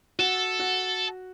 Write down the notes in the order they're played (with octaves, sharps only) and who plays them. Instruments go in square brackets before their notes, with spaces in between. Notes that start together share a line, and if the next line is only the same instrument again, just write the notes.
[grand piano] F#4 [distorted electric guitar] A4
[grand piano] F#4